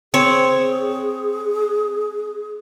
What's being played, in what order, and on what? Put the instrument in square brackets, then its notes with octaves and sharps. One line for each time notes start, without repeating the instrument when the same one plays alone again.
[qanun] C4 C#5 [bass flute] G#4